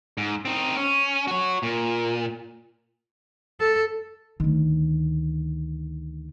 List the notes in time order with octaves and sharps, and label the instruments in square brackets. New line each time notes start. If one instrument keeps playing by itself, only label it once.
[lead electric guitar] G#2
C4 D#4
C#4
F#4 C#5
A#2
[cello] A4
[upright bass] D2 D#3